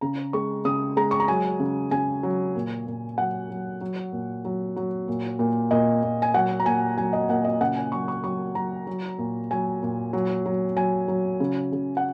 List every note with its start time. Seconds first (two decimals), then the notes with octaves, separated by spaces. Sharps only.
0.01 C#3 A#5
0.33 G#3 C#6
0.65 C#3 D#6
0.97 G#3 A#5
1.11 C#6
1.20 A#5
1.28 F#3 G#5
1.60 C#3
1.91 C#3 G#5
2.23 F#3
2.55 A#2
2.87 A#2
3.18 F#3 F#5
3.50 F#3
3.81 F#3
4.12 A#2
4.45 F#3
4.76 F#3
5.08 A#2
5.39 A#2
5.71 A#2 D#5
6.03 A#2
6.22 G#5
6.34 F#3 F#5
6.60 A#5
6.66 A#2 G#5
6.97 F#3 G#5
7.13 D#5
7.29 A#2 F#5
7.44 D#5
7.61 C#3 F#5
7.76 G#5
7.92 F#3 C#6
8.08 C#6
8.24 F#3 C#6
8.55 F#3 A#5
8.87 F#3
9.18 A#2
9.51 F#3 G#5
9.83 A#2
10.13 F#3
10.46 F#3
10.76 F#3 G#5
11.08 F#3
11.40 C#3
11.72 C#3
11.97 F#5